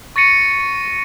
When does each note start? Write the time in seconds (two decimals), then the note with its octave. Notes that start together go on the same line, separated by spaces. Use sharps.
0.16 C#6 A6 A#6 C#7 D#7